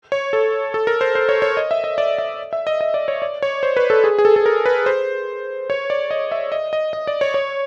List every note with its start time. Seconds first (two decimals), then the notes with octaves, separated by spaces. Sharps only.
0.12 C#5
0.33 A4
0.74 A4
0.87 A#4
1.01 C5
1.15 C5
1.29 C#5
1.42 C#5
1.57 D#5
1.71 E5
1.84 D#5
1.98 D5
2.18 E5
2.53 E5
2.67 D#5
2.81 D#5
2.94 D5
3.08 C#5
3.22 D5
3.42 C#5
3.63 C5
3.77 B4
3.90 A4
4.04 G#4
4.18 G#4
4.25 A4
4.36 A4
4.46 A#4
4.66 B4
4.86 C5
5.70 C#5
5.90 D5
6.11 D#5
6.32 E5
6.52 D#5
6.73 D#5
6.93 D#5
7.07 D5
7.21 C#5
7.34 C#5